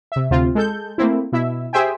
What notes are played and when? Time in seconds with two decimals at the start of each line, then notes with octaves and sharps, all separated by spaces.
0.12 C3 E5
0.30 D2 C3 C4 F4
0.55 G#3 A4 G6
0.98 A3 A#3 C4 E4
1.32 B2 E4 E5
1.73 G4 G#4 C5 E5 G5 G#5